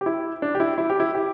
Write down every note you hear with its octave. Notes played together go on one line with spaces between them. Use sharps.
G4
E4
D4
G4
E4
E4
G4
E4
G4